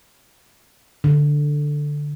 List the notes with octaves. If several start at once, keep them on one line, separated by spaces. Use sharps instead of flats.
D3